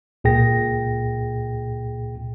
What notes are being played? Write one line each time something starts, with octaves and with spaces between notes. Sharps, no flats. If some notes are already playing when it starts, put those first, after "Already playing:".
C#2 A#2 G#4 G5 A#6